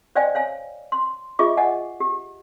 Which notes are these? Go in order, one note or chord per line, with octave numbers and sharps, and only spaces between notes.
C5 D5 D#5 F5 G5 G#5
C#5 F5 G#5
C6
F4 G#4 D#5 E5 C#6 D6
D#5 F#5 G#5
G4